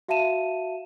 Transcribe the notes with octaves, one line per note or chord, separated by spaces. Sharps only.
F#4 E5 F5 A5 D#7 E7